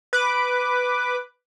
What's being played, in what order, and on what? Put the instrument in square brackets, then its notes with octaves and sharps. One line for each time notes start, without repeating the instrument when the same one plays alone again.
[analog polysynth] B4 D6